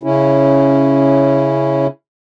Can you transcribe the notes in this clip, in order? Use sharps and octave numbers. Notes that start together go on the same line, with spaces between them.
C#3 C#4 E4